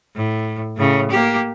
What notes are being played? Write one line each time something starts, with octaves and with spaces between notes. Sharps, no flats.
A2
A2 C#3
A#3 G4